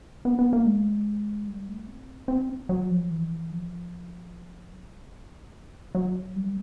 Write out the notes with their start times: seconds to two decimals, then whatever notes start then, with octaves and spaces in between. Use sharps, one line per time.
0.25 B3
0.39 B3
0.53 A#3
0.66 G#3
1.48 G3
1.68 A3
1.88 C4
2.28 C4
2.69 F#3
2.90 F3
3.11 E3
3.51 F3
4.73 F#3
5.95 F#3
6.36 G3